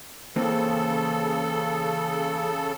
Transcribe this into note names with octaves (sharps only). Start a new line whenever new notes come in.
C#3 E3 A#3 C4 A4